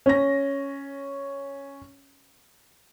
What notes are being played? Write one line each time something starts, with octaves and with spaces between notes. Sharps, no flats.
C#4 A#6